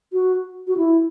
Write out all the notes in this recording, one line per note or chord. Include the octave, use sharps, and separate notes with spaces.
F#4
F#4
E4